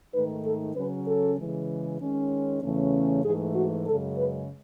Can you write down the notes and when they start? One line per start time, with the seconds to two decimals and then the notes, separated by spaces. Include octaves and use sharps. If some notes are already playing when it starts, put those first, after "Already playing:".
0.14 G#2 D#3 A3 D#4 B4
0.45 A4
0.75 C#3 F#3 C#4 B4
1.07 A4
1.37 C#3 E3 G#3
2.00 D#3 G#3 C#4
2.62 E2 C#3 E3 A3 C#4
3.24 G#2 E3 A3 G#4
3.55 F#4
3.86 F#2 C#3 G#3 A4
4.17 B4